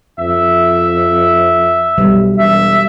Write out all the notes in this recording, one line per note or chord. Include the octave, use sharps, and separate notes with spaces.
F2 E5
B1 G3
E1 E5